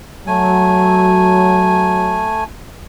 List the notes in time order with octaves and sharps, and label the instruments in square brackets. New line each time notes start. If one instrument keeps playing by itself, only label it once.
[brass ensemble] F#3 [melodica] A3 G#5